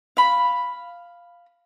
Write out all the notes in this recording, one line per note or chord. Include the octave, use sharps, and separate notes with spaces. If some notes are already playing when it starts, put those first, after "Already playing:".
F5 B5